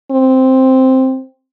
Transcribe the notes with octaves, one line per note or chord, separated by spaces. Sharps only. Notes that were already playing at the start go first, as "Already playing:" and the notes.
C4